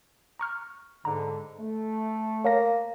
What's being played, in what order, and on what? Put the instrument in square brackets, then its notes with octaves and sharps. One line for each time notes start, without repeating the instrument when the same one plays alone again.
[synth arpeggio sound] A#5 C#6 F6
[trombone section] G#2 D3 [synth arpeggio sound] A#5
[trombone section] A3
[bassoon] A#3 [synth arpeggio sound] C#5 F5 A#6